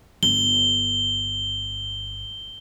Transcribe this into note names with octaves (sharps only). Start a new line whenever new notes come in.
G1 G7